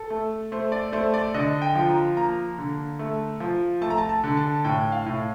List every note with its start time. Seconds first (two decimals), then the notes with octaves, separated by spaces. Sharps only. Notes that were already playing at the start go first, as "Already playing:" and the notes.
Already playing: A4
0.10 A3
0.52 A3 C5
0.72 D5
0.93 A3 C5
1.14 D5
1.34 D3 D#5
1.62 G5
1.75 F3
1.89 A#5
2.17 A#3 A#5
2.58 D3
2.99 A3
3.40 F3
3.81 A3 A5
3.90 A#5
3.98 A5
4.09 A5
4.24 D3
4.37 A5
4.64 A2 G5
4.92 F5
5.06 A2